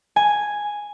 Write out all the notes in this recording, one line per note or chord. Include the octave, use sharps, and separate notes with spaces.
G#5